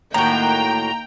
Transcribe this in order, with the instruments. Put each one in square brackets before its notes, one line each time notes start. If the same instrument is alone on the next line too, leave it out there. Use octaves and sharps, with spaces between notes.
[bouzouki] A2 F#4 [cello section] D#3 A#3 [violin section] G5 [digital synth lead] A#5